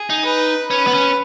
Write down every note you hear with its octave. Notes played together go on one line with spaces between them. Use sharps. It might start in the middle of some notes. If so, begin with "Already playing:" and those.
Already playing: G#4
D#4
B4
C#4 B4
B3
C#4